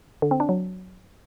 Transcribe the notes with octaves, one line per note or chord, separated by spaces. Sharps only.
D3
C4
D4
F#3